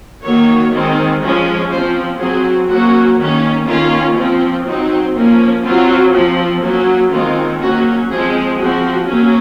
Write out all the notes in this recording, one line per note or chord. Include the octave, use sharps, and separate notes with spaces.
D#3 F#3 A#3 C#5
D#3 G#3 C4
F3 G#3 C#4
F3 C4 C5
F#3 C4 G#4
F#3 A#3 C#4 F#4
D#3 A#3 C#4
D#3 A#3 C#4 F4
F3 C4
F#3 C4 D#4
F3 A#3 C#4
F#3 C4 F4
F3 C4
F#3 A#3 C#4
D#3 G#3 C4 F4
F#3 A#3 C#4 F#4
F3 G#3 C4 G#4
F3 C4 F#4
F#3 A#3 C#4